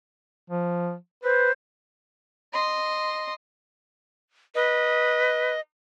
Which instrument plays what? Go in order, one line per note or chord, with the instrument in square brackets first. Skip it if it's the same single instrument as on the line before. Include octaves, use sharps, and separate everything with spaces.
[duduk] F3
[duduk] B4 [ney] C5
[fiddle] D#5 C6
[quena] B4 [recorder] D#5